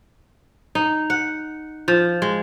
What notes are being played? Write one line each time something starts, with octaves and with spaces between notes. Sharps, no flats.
D#4
F#5
F3
G#3